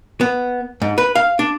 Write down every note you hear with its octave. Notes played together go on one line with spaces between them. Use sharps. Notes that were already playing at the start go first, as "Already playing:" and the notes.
B3
G#2
B4
F5
D4